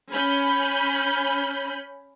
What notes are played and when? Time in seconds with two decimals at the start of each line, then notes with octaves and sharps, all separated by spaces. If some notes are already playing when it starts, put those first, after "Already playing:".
0.11 C#4 B5 G6